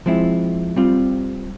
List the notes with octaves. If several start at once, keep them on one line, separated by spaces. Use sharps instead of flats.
F3 G#3 C4 E4
G3 C4 F4